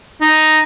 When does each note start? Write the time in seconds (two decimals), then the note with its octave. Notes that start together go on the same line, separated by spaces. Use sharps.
0.21 D#4